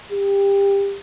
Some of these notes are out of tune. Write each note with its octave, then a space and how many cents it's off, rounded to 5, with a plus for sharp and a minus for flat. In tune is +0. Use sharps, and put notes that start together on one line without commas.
G4 +20